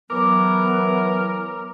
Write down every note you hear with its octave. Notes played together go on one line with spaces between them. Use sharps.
E3 F#3 B3 A#4 D6